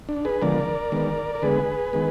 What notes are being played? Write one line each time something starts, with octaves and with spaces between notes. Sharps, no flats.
D4
G#4 B4
D3 F3 G#3 B3 A#4 D5
D#3 G#3 B3
A#4
D3 G#3 B3 G#4 B4
D#3 G#3 B3